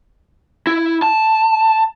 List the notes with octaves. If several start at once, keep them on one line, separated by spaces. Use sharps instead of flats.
E4
A5